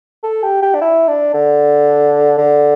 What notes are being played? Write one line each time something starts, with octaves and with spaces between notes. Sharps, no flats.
A4
G4
G4
D4
E4
D4
D3
D3